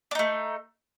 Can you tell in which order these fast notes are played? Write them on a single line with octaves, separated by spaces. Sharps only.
D4 D#4 A3